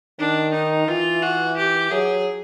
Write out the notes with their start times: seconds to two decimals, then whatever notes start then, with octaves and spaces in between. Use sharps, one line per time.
0.19 D#3 D4
0.53 D#4
0.88 E3 F4
1.22 F#4
1.57 G4
1.91 F#3 G#4